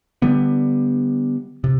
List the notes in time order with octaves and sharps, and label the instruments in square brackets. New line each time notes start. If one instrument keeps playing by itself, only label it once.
[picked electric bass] D3 G3 B3
C3